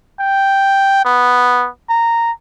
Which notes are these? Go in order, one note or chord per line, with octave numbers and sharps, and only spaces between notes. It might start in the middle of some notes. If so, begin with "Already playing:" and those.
G5
B3
A#5